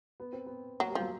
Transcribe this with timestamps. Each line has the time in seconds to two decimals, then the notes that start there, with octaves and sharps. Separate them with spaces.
0.20 B3
0.33 C4
0.46 B3
0.80 F#3 A#3
0.90 G3
0.95 F3 F#3